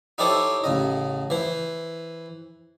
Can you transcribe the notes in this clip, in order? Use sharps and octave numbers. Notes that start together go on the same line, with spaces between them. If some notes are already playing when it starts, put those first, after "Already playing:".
D#4 E4 G4 A4 C5 C#5
A1 C#3 D#5
E3 C5